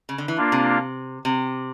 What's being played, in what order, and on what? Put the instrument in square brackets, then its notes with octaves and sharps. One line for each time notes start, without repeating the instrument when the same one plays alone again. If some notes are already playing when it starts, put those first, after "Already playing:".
[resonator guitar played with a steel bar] C#3
D3
E3
[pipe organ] A#3 D4 F4
[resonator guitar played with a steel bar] C3
C3